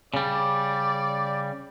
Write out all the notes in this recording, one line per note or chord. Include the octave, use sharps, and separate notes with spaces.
C#3 G3 D5